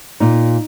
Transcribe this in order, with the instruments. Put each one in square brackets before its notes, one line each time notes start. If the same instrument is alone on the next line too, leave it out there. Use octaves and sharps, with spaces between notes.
[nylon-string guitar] A#2 D#4